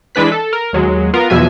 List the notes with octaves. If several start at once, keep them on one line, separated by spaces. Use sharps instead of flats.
E3 G#3 D4 B4 B6
A4
A#4
D#2 F#3 G#3
B3 F4 A#4
E2 B2 F3 F#3 E5 G#5